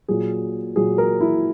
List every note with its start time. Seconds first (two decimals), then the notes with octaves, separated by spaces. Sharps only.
0.08 A#2 F#3 G#4
0.76 A#2 F#3 G#4
0.98 A#4
1.21 E4